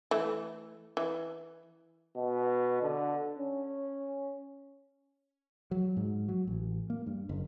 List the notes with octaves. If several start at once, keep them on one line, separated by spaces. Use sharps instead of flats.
E3 A3
E3
B2
D3
C#4
F#3
G#2
F#3
A1
A#3
G2
F#1